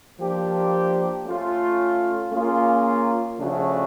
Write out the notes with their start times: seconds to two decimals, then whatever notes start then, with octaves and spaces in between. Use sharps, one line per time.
0.17 F3 A#3 D4 G4 C5
1.25 A3 C#4 F4
2.31 A#3 C#4 F4 G#4
3.38 C#3 F3 A3 D4 F#4